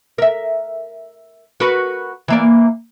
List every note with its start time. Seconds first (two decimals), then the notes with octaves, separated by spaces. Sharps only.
0.18 A#4 E5
1.60 F#4 A#4 B4
2.28 E3 A#3 D5